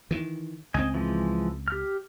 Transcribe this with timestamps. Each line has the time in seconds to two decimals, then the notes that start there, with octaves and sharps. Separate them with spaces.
0.11 D#3 E3
0.74 C#2 C4 D#5 G#5
0.94 E3 F3 G#3
1.68 G4 F6